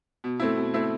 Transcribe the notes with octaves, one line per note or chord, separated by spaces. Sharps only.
B2
A3 C4 E4
B2
A3 C4 E4